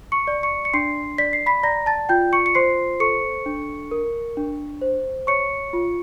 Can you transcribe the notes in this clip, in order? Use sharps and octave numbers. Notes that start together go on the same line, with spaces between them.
C#6 C#7
D5
C#6 C#7
C#7
D4 C6 C7
D5 B6
C7
B5 B6
D5 A#5 A#6
A5 A6
F4 G5 G6
C#6 C#7
C#7
C5 C6 C7
A4 C#6 C#7
D4
A#4
D4
C5
C#5 C#6 C#7
F4